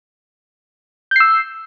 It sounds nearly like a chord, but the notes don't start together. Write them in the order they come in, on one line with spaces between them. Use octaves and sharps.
G6 C7 E6